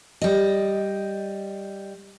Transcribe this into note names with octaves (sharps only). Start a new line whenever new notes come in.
G3 D#5